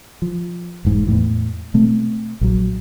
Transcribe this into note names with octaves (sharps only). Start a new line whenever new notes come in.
F3
E1 G#2
E2 A2 E3
B2 A3 C4
A#1 F#3